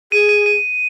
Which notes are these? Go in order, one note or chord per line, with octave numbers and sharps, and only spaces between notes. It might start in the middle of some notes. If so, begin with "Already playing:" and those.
G#4 D#7
D#7
D#7